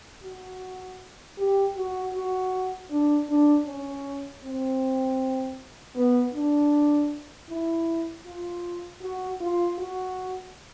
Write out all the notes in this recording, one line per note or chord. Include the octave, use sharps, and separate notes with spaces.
F#4
G4
F#4
F#4
D4
D4
C#4
C4
B3
D4
E4
F4
F#4
F4
F#4